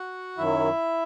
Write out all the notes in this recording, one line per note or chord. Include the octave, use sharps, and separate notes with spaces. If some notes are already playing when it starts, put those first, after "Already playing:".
Already playing: F#4 F#5
F#2 D#3 F#3 E4 E5